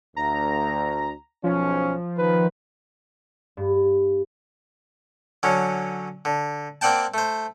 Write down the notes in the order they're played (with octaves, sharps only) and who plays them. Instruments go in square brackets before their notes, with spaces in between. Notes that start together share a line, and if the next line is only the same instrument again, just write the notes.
[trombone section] D2 [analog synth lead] A#5
[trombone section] B1 C#4 [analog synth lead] F3
[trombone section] D#3 B4
[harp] G2
[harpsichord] D3 F#3 C#4
D3
A#3 C4 D5 F#5 G5 A5
A3 C5